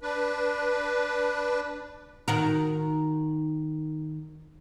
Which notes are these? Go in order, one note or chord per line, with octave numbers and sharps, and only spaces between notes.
D4 B4
D#3 F#4 A#4